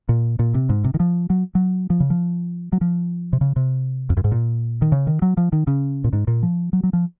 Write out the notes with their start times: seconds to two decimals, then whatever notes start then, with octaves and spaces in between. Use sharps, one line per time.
0.09 A#2
0.39 A#2
0.54 C3
0.69 G#2
0.84 C3
0.94 D#3
1.00 F3
1.30 F#3
1.55 F#3
1.90 F3
2.00 C#3
2.10 F3
2.73 F#3
2.81 F3
3.33 C3
3.41 C#3
3.56 C3
4.10 F2
4.17 F#2
4.24 G#2
4.32 A#2
4.82 D#3
4.92 C#3
5.07 D#3
5.22 F#3
5.37 F3
5.53 D#3
5.67 C#3
6.04 A#2
6.13 G#2
6.28 A#2
6.43 F3
6.73 F#3
6.83 F#3
6.93 F3